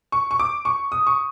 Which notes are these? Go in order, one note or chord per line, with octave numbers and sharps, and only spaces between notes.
C#6
C#6
D6
C#6
D#6
C#6